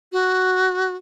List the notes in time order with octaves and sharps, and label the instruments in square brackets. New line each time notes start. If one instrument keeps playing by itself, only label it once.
[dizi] F#4